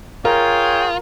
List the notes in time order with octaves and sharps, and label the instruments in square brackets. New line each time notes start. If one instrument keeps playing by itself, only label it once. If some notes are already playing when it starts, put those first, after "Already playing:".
[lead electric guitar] F4 [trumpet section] G#4 C#5 G5 [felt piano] A#4